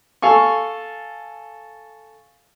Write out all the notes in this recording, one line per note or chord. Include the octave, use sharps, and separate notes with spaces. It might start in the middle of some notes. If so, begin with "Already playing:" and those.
A4 F5 G#5 C#6